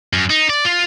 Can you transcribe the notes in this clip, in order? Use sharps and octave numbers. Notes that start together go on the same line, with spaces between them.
F#2
D#4
D5
F4